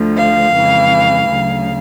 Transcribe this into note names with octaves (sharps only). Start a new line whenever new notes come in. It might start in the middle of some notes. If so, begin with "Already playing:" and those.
Already playing: D2 D3 F3 A3
F5
F2 C#3 E3 G#3
D2 C#3 F#3